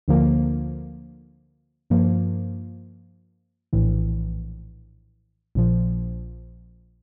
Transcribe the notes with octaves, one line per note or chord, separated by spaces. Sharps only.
D2 D3 F3 A#3
G2 F3 A#3
A#1 A2 E3
A#1 A#2 F3